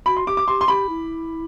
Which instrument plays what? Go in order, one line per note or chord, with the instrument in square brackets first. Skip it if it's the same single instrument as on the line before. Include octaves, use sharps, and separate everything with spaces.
[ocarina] F#4 [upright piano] B5
[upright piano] C6
[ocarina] G4 [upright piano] D6
[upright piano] D6
[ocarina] G4 [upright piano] C6
[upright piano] C6
[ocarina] G4 [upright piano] B5
[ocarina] E4